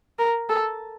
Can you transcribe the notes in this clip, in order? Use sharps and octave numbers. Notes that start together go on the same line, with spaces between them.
A#4
A4